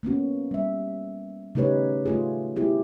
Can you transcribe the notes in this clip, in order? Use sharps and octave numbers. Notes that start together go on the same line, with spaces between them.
A#3 B3 C#4 F#4
G3 E5
C#3 A3 D#4 G4 B4 C#5
A3 F4 G#4
B3 E4 G4 G#4